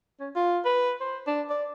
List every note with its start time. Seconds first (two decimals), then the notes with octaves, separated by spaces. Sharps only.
0.20 C#4
0.35 F4
0.65 B4
1.01 C5
1.27 D4
1.50 D5